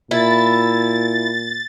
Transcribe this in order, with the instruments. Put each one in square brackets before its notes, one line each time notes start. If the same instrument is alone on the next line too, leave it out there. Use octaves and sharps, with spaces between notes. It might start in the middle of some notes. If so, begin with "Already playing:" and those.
[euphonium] A#2 [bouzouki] E4 [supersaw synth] A6